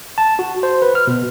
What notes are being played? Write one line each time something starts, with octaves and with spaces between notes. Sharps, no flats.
A5
F#4
C5
B4
F6
B2